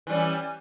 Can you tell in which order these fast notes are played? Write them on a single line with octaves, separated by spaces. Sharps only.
E3 G3 C#4